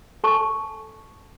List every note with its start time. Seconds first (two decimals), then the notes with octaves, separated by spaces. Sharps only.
0.24 A4 G#5 A5 C#6